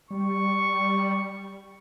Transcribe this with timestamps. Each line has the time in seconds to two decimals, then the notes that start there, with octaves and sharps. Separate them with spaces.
0.10 G3 C#6